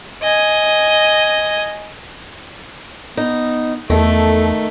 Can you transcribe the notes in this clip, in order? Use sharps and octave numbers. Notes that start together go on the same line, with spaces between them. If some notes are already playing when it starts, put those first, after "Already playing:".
D#5 G#5
B3 D#4
E2 D#3 A3 A4